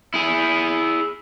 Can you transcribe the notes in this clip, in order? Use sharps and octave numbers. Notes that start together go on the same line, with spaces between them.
E4 G#4